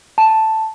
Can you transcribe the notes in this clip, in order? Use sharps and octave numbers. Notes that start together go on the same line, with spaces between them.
A5